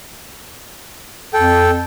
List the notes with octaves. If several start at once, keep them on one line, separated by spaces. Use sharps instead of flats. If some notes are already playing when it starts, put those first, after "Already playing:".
F2 A4 G5